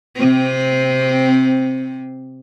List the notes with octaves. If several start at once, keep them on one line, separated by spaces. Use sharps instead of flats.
C3 C4